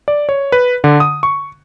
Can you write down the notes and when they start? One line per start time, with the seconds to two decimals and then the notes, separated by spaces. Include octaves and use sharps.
0.08 D5
0.29 C#5
0.52 B4
0.84 D3
1.00 D#6
1.23 C#6